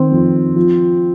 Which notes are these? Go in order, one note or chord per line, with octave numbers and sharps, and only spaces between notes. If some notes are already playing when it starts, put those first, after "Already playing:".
Already playing: D#3 C4
F2
F3